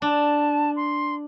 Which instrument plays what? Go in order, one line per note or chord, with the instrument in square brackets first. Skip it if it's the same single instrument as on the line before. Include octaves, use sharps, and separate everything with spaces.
[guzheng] D4 [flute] A5
[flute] C6